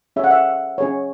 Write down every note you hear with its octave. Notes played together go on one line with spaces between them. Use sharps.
C#4 G#4 C#5 E5
F#5
E5
C#4 G#4 C#5